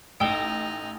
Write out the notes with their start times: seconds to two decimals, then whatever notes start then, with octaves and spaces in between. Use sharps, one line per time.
0.20 A1 D#4 G5 E6 E7 G7